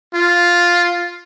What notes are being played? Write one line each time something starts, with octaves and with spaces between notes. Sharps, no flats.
F4